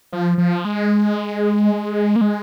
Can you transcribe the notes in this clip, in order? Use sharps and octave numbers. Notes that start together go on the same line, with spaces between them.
F3
F3
G#3
A#3
G#3